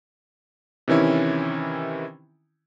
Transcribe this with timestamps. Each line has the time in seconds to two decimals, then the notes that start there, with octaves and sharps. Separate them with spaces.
0.88 C3 D#3 E3 C#4 E4